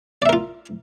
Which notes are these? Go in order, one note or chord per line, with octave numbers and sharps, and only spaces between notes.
F4 A#4 D5 E5